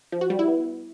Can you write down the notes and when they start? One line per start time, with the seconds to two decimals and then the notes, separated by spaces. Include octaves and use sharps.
0.12 F3
0.21 F#4
0.30 G3
0.39 E4
0.48 B3